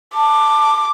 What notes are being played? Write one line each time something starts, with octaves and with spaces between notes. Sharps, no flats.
A5 D6